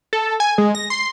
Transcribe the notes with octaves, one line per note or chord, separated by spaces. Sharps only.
A4
G#5
G#3
A#6
C6